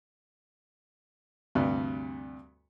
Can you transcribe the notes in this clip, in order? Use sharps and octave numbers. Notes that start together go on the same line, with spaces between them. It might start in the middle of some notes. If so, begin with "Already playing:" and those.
D2 G2 C3